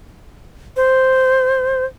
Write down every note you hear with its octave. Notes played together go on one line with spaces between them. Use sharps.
C5